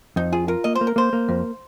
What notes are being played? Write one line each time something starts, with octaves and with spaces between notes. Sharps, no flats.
F2 D#4
F4 G#4
F4 A#4
A#3 D#5
C5
A#3
A#4
A#3 C5
A#3
F2